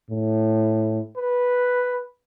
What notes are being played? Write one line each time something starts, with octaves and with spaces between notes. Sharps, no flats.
A2
B4